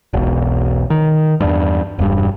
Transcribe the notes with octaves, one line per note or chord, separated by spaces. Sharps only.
E1 B1
D#3
E2 G2
E1 G2